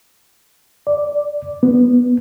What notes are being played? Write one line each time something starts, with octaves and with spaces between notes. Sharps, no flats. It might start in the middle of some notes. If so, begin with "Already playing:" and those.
D5
B3